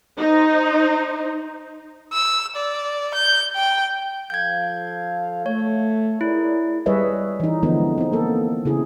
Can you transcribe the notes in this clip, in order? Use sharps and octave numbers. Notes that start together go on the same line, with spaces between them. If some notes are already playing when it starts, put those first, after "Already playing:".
D#4 C5
E6
D5
G6
G5
F3 A4 F5 G6 G#6
A3 C#5
E4 G#4 A#4 D5
G3 G#4 B4 C#5 D#5 E5
E3 D#4
D3 E3 F3 G#3 B3 D#4
C4 D#4
A#3 B3 A4
C#3 E4 G#4